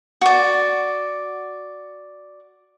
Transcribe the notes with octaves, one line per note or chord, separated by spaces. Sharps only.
F#4 D5